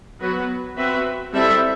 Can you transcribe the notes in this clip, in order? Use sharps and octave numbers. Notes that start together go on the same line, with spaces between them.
F#3 B3 F#4 B4
C4 F#4 B4 E5
G3 C4 E4 A4 E5